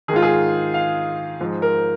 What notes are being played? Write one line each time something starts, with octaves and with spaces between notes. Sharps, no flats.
D#3 G#4
G#2 F4
G#4
F5
G#2 F3
A#4